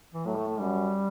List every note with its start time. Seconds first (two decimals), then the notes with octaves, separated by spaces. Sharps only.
0.14 E3
0.25 A2 F#3
0.37 A3
0.48 A3
0.60 F#2 G3